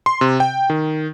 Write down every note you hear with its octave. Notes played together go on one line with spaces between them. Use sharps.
C6
C3
G5
D#3